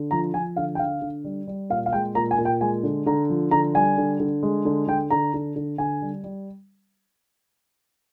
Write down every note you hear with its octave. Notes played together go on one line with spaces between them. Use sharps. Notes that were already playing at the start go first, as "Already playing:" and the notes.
Already playing: D3
F3 A#5
F3 G#5
D3 F5
G5
D3 F5
D3
G3
G3
A#2 F5
F5
G#3 G5
A#2 A#5
G#5
A#2
G5
G#3 G#5
D3
D3 A#5
F3
D3 A#5
G3 G#5
D3
D3
G#3
D3
D3 G5
D3 A#5
D3
D3
D3 G#5
G3
G3